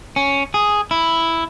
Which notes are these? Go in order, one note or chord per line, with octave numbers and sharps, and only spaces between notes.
C#4
G#4
E4